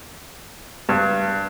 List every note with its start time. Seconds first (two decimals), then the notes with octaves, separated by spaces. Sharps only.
0.89 G2